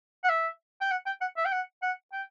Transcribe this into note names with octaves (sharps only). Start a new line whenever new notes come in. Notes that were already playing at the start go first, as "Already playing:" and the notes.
F#5
E5
G5
F#5
G5
F#5
E5
G5
F#5
F#5
G5